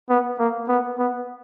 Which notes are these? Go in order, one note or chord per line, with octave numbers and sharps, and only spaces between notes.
B3
A#3
B3
B3